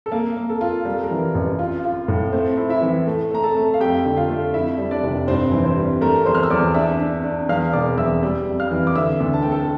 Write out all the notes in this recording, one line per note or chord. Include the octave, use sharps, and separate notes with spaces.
A4
A#3 A#4
A#3
A4
F4
G3 A#4
A4
A#4
E3
A1
F4
F4
A2
A3 C4 C5
E4
E4 E5
E3
A3
A3 A#5
A4 A5
A3
F5
F2 G4 G5
D3
F4 F5
A3
F2 E4 E5
G3
D4 D5
F1
G2 C4 C5
E3
C4 C5
G3
A3 A#4 A#5
E2 C5 C6
F6
E6
E2 D5 D6
D4 E5 E6
D4
D4
E2 F5 F6
E1 D5 D6
E2 E5 E6
G3
F2
F5 F6
E3
D6
D3 E5 E6
D2
A5
A3 G5
A4 A5